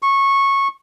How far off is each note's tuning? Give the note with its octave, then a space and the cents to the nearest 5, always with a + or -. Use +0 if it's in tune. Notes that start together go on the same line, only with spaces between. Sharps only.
C#6 -15